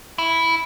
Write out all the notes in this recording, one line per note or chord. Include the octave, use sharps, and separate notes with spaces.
E4